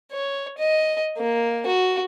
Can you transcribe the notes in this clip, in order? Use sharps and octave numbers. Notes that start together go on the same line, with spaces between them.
C#5
D#5
A#3
F#4